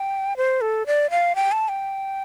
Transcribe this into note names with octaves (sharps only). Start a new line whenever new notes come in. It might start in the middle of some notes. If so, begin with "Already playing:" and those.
Already playing: G5
C5
A4
D5
F5
G5
A5
G5